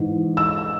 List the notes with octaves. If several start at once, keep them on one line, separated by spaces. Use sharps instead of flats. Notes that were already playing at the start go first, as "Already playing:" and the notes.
Already playing: G#2 E3
E6